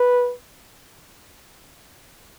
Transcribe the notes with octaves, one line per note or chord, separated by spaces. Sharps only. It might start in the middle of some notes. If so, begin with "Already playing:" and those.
Already playing: B4